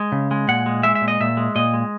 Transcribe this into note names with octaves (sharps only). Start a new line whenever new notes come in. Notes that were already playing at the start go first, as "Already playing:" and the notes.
Already playing: G#3
C#3
G#3
A#2 F#5
G#3
G#3 E5
E5
A#2
D#5
A#2 E5
G#3
A#2 D#5
G#3